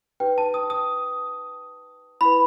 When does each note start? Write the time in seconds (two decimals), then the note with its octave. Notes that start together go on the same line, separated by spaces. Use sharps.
0.20 D#4 G4 B4 G5
0.38 A5
0.54 D#6
0.70 D#6
2.21 E4 B4 B5